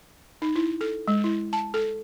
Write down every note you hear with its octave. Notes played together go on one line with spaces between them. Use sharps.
D#4
E4
A4
G#3
E4
A5
A4